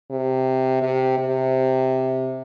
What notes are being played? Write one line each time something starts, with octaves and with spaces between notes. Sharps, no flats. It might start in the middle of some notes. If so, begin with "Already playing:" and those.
C3
C3
C3